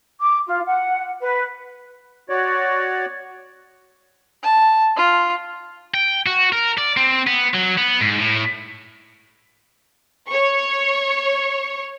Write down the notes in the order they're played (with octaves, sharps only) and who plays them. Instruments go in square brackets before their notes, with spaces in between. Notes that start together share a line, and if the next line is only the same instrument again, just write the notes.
[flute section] D6
F4
F#5
B4
[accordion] F#4 C#5 D5
[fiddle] A5
F4
[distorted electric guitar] G5
F#4
A#4
D5
C4
B3
F#3
B3
G#2
A2
[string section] C#5 C#6